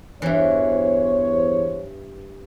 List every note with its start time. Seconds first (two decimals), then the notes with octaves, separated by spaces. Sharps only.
0.22 E2 G2 E3 C5 C#5